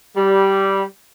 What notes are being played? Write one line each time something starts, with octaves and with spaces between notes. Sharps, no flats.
G3